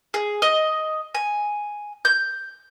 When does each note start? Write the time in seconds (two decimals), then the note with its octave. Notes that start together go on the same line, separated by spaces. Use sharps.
0.14 G#4
0.42 D#5
1.15 G#5
2.05 G6